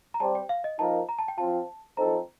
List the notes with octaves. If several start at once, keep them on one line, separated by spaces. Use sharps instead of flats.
A#5
G3 C4 G4 C5 A5
G5
F5
D#5
F3 A#3 D#4 A#4 A5
A#5
A5
G5
F3 C4 F4 A5
F3 C4 D#4 A4 C5 A#5